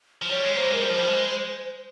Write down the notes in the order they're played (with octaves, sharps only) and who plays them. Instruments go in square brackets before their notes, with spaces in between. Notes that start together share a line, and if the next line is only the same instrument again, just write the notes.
[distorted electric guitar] F3
[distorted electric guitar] G3 [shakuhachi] C#5
[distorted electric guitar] G#3
[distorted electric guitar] A#3 [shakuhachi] C5
[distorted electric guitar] G3
[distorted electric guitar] G#3 [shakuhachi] A#4
[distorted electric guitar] G3 [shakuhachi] C5
[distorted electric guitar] F3
G3
G#3